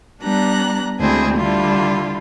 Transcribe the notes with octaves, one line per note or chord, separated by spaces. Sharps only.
G3 B3 D4 A#5 F#6
D2 G#3 C4 E4 G#4
D3 G3 E4 F4